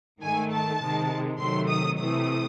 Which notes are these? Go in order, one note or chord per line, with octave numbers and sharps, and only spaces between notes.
G#2 D#3 A3 G#5
A5
C3 D#3 G#3
C3 D#3 F#3 A3 C6
D#6
C3 E3 A3 D#6